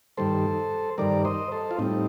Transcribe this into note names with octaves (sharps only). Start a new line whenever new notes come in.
G2 D#3 G3 A4 C5
G2 D#3 G3 A#4 D5
C5 D#5
A4 C5
F4
A2 G3 C4 D#4